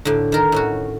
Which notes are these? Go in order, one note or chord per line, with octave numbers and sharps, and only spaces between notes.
A2 D3
D#3 A#4
A2 C#4 F#4